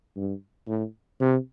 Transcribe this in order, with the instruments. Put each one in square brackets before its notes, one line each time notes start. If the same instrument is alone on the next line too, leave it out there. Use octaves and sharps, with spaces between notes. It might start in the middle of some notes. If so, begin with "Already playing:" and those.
[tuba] G2
A2
C3